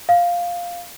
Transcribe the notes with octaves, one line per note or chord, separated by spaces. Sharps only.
F5